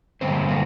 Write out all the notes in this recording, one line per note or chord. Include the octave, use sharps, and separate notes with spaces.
G2 D3 G3 A#3 C4 C5
A#3 A#4